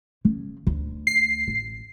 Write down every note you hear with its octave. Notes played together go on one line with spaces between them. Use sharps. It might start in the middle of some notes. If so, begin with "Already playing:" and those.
C#3
D2
C7
A1